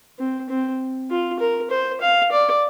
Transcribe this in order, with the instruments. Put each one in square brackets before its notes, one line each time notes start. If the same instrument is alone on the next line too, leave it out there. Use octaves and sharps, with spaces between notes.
[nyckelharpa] C4
C4
F4
A#4
C5
F5
D5